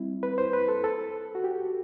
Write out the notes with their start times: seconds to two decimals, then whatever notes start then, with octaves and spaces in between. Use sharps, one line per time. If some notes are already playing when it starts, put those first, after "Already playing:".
Already playing: G3 C4 E4
0.23 B4
0.38 C5
0.53 B4
0.68 A4
0.84 A4
1.35 F#4
1.44 G4